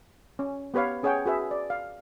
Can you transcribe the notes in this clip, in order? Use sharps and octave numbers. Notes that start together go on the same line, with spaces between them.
C#4
B3 G4 B4 C#5 F5
C#4 G#4 C#5 F#5 G5
F#4 G#4 B4 E5
D5
F5